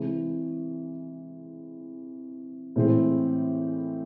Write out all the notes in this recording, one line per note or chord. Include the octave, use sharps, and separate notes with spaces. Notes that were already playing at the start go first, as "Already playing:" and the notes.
Already playing: C3 E3 G#3
A2 E3 G#3 C4